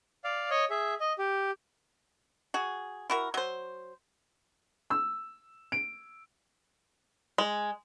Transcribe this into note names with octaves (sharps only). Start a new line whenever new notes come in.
D5 F5
C#5 D#5
G#4 E5
D#5
G4
F#4 G#4
E4 F#4 A#4
F#3 C5
E6
D7
G#3